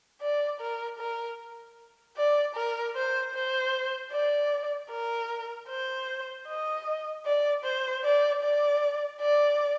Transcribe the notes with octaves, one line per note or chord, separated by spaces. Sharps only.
D5
A#4
A#4
D5
A#4
C5
C5
D5
A#4
C5
D#5
D5
C5
D5
D5
D5